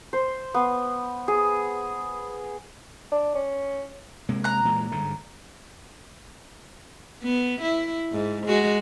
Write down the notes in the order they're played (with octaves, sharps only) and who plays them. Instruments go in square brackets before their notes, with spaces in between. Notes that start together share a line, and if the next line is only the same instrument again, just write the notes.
[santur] C5
B3
G#4
[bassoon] D4
C#4
[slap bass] C3 G#3 A#3
[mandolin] A#5 F#6
[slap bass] A#2 E3 G#3
G1 G#2 D3
[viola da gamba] B3
E4
G#2
G#3 F#4